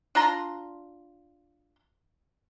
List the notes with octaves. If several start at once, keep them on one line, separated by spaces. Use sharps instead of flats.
D4 F4 A#5 C6